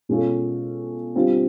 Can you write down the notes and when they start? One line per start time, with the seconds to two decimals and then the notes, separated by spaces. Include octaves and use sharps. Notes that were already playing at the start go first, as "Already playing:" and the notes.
0.09 B2 G#3 C#4 F4 A4
1.15 D3 G3 C4 F4